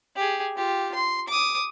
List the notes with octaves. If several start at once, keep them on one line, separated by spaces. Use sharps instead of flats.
G4 G#4
F4 G4
C6
D6 D#6